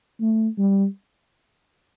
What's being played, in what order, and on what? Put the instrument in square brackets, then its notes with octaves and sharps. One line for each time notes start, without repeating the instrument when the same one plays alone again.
[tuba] A3
G3